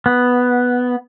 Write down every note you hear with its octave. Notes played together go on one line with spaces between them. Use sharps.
B3